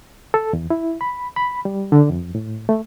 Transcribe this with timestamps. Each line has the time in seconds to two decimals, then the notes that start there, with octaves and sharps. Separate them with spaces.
0.34 A4
0.53 E2
0.70 E4
1.01 B5
1.36 B5
1.65 G3
1.92 D3
2.10 F2
2.35 A2
2.69 A3